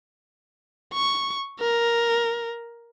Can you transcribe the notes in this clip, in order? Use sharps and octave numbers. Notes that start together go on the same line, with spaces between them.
C#6
A#4